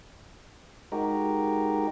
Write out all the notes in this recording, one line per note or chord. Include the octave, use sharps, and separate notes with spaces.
G#3 D#4 F#4 G4 A#4